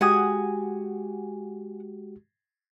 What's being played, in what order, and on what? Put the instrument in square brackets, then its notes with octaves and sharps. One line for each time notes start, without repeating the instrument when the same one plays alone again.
[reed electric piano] G#3 F#4 G4 [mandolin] F#5 G#5 D#6